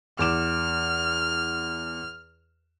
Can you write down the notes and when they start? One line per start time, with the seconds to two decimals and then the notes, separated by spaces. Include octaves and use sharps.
0.19 E2 D6 F6 E7